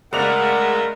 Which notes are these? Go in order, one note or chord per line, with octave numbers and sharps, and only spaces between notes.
C#3 G#3 A3 A#4 D5 F#5 F7